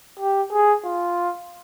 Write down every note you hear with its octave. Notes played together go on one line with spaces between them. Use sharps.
G4
G#4
F4